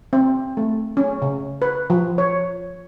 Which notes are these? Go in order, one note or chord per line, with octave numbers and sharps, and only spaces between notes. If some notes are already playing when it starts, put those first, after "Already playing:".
C4
A3
C#4
C#3
B4
F3
C#5